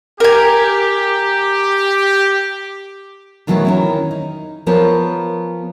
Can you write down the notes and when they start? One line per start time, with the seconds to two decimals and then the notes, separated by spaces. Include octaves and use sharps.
0.20 G4 A#4 G#5
3.47 B2 D#3 E3 F#3 A3 B3
3.65 D#3 C#4 E4
4.11 D#4
4.67 F3 B3 A#4 C5 C#5